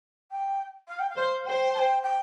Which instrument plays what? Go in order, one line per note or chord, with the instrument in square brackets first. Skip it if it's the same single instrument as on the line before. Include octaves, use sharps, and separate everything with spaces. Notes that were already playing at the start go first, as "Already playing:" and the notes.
[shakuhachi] G5
F5
G5
F5
[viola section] C5
[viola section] C5 [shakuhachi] G5
[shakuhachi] A5
G5
G5